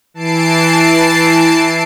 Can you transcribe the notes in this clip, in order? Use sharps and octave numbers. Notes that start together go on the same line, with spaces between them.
E3 A5 C7 D7